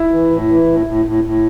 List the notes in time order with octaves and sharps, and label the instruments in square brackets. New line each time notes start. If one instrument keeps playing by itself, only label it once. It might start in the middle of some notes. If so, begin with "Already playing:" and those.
Already playing: [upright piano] E4
[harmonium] E3
A2
E3
A2
A2
A2
A2